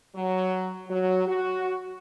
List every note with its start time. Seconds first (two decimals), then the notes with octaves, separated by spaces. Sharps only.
0.16 F#3
0.88 F#3
1.27 F#4